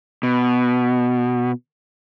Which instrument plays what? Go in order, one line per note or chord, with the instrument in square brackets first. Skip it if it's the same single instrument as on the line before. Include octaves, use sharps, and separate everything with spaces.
[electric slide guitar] B2